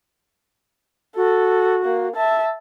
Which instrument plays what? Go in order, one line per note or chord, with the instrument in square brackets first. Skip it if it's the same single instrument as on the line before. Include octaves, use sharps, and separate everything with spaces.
[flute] F#4 [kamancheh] A4
[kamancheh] A#3
E5 A5